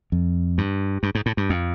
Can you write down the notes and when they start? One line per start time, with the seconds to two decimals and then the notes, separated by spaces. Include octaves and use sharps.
0.12 F2
0.58 G2
1.03 G2
1.15 G#2
1.26 A2
1.37 G2
1.50 F2